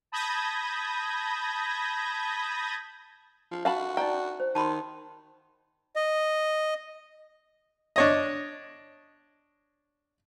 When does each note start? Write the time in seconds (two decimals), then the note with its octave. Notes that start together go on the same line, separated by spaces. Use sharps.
0.12 A5 B5 D#6 G6 G#6 A#6
3.52 F3
3.65 F#4 F5 A5 B5
3.97 D#4 D5 G5 A#5
4.40 C5
4.55 D#3 A5 B5 C6
5.96 D#5
7.96 D4 C#5 D#5